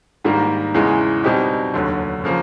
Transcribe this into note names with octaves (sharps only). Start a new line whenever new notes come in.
G#2 D#3 G3 A#3
E2 C#3 E3 G#3
B2 G3 C4 D#4 G4
F1 D#2 D3 F#3
C#3 F3 A#3